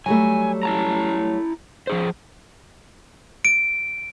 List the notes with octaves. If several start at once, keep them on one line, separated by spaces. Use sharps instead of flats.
F#3 G3 A3 G#5
E4 A5 A#5
F3 G#4 C5
D7